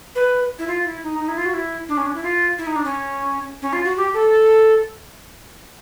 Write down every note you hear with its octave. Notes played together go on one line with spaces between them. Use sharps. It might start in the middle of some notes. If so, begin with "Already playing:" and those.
B4
E4
F4
E4
D#4
D#4
E4
F4
F#4
E4
D4
C#4
D4
E4
F4
E4
D#4
D4
C#4
C#4
F4
F#4
G4
A4